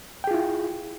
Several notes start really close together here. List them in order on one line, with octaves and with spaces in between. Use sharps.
G5 G#4 F4 E4